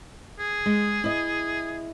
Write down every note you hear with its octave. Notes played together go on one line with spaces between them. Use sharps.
G#4
G#3
E4 D#5